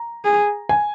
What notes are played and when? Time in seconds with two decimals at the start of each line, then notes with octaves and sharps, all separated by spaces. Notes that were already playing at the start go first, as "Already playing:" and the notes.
Already playing: A#5
0.24 G#4
0.69 G#5